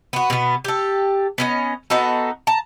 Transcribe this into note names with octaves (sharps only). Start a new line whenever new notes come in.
B3 F#4
B2 B3
G4 A4
B3 C#4 D#5
B3 D#4 F#4 A4
A5 A#5